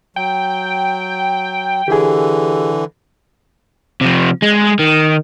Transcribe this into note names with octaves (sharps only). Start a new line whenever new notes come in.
F#3 G5
D3 E3 G4 G#4
C3 F3
G#3
D#3